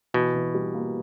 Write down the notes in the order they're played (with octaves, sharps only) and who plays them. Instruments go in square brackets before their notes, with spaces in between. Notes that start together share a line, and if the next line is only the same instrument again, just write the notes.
[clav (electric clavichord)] B2 [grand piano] E3
[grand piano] E3
G3
A#3